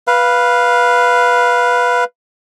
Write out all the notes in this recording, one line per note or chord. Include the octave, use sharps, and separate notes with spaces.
B4 F5